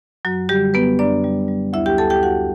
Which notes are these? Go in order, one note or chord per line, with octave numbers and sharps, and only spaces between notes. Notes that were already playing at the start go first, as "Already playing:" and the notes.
F#2 F#3 F#4
D3 G3 G4
F#2 B3 B4
F#2 D4 D5
G3
G3
D2 E4 E5
G4 G5
D2 A4 A5
G4 G5
E2 F#4 F#5